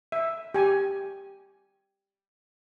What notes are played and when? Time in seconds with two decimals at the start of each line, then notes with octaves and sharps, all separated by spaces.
0.12 E5
0.54 G4 G#5